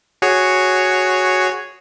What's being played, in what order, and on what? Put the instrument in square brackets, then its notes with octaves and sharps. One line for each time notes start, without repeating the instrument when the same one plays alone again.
[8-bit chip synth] F#4 G#4 C#5